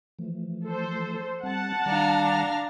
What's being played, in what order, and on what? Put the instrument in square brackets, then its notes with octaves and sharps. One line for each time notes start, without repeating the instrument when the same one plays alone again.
[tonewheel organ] E3 F3 A3
[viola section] A4 C5
[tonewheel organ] G3 C4 [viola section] F#5 A5
[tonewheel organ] D#3 G3 [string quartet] D4 F5 A#5